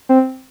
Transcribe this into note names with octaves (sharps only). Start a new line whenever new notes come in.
C4